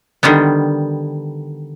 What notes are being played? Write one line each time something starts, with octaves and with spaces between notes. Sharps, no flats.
D3 D#3 G3 B3